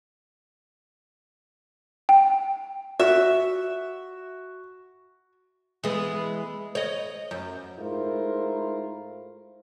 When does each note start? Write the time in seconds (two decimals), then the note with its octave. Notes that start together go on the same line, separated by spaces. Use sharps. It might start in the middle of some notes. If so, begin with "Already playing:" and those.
2.09 G5
3.00 F#4 E5
5.84 E3 G#3 B3
6.75 C#5 D#5
7.31 F#2
7.79 G#2 A3 E4 F4 A#4 C5